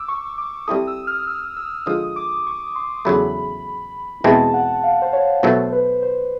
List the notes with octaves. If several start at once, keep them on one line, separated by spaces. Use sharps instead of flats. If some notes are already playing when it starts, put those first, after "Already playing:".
Already playing: D6 E6
C#6
D6
G3 C4 E4 A4 D#6
E6
F6
E6
E6
D3 F3 G#3 D#6
D6
C#6
C6
E2 C#3 F#3 A3 B5
E2 B2 G#3 C4 E4 A5
F#5
F5
C5
C#5
B2 F#3 A3 C5
B4
C5